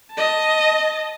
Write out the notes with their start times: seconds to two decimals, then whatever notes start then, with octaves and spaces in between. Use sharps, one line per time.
0.13 D#5 A5